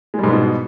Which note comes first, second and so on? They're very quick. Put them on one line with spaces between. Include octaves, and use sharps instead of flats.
G#3 G3 G#2 B3 B2